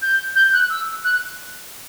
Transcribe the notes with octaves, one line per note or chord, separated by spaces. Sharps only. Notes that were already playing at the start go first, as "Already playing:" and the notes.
G6
G6
F#6
E6
F#6